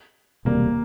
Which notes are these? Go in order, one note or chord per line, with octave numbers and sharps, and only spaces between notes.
E1 D2 C3 G3 A#3